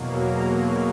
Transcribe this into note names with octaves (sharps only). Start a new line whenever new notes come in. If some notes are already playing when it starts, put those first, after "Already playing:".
Already playing: E2 B2 F#3 A#3
A#5